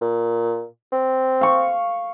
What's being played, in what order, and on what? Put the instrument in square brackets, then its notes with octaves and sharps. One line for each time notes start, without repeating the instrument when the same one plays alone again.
[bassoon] A#2
C4
[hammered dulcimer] F5 C#6